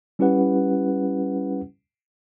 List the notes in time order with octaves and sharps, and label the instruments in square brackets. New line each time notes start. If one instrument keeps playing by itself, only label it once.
[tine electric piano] G3 C#4 E4 G4 B4 F#5